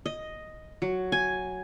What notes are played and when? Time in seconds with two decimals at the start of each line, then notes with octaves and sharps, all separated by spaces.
0.06 D#5
0.82 F#3
1.12 G#5